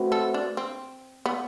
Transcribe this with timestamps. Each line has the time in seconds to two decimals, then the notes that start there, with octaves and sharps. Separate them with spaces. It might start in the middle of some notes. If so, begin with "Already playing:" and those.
Already playing: A3 C4 F#4 B4
0.12 A4
0.34 D4
0.57 C4
1.26 B3